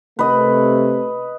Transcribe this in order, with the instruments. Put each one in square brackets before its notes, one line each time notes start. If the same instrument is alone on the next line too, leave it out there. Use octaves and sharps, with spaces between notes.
[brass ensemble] C3 A3 [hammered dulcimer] B4 D#5